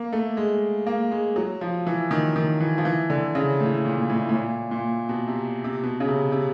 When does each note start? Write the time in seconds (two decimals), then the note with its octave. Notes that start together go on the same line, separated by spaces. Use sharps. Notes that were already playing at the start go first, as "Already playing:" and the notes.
Already playing: A#3
0.13 A3
0.37 G#3
0.87 A#3
1.11 G#3
1.36 F#3
1.61 F3
1.86 E3
2.11 D#3
2.36 D#3
2.60 E3
2.78 F3
2.85 E3
3.10 D3
3.35 C#3
3.60 A2
3.85 A#2
4.10 A2
4.29 A2
4.34 A#2
4.71 A#2
5.09 B2
5.28 C3
5.64 C3
5.83 B2
6.00 C#3
6.08 C3
6.32 C3